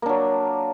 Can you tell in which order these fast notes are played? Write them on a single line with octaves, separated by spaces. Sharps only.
A#3 D4 F#3